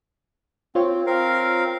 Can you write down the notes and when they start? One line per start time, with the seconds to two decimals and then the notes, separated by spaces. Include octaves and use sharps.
0.75 C4 F4 C5 C#5
1.06 C4 A#4 F5